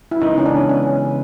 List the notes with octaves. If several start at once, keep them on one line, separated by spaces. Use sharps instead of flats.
E4
C#3 E3 G#3 B3 D#4
C#4
D4
C#4